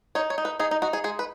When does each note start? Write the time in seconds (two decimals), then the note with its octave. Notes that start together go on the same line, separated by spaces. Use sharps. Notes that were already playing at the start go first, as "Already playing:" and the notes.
0.15 D#4 C#5
0.30 C#5
0.38 D#4
0.45 B4
0.59 D#4 G#4
0.71 D#4
0.82 D#4 F#4
0.93 G#4
1.04 G#3 G#4
1.19 B4